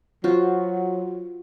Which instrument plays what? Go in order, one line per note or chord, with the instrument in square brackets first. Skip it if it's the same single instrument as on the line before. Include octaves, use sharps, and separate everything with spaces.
[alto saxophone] F#3 [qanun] F4 F#4 C5